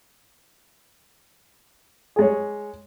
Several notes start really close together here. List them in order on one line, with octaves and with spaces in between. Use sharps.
G#4 G#3 C#5